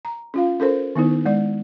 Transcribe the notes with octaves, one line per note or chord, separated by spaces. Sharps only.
A#5
C#4 F4 F5
C#4 A4 A#4 C5
D#3 B3 D#4 E4
G#3 D5